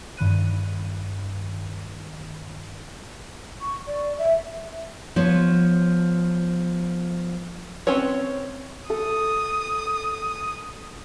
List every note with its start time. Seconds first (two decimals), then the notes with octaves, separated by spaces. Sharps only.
0.17 G2 D#3 B5 F#6 D#7
3.60 C#6
3.87 D5
4.18 E5
5.16 F3 B3 C#5
7.87 C4 C#4 B4 C#5
8.90 A4 D#6